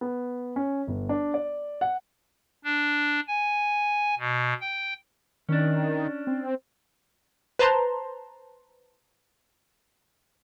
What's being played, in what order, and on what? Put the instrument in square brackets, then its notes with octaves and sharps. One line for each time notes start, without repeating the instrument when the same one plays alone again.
[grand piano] B3
C#4
G1
D4
D5
F#5
[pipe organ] D4
G#5
B2
G5
[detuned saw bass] D#3 [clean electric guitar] C#4 D4
[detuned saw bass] C4
[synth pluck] B4 C5 A5 A#5 C6